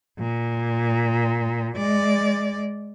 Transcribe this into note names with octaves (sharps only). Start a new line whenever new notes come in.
A#2
G#3 D5